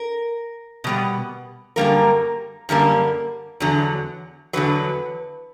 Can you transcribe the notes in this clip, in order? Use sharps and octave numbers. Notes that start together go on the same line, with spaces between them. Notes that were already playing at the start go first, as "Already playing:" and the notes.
Already playing: A#4
B2 G3 B3
F#2 D3 G3 A#3 A#4
F#2 D3 G3 A#3
E2 D3 F#3
E2 D3 F#3 B4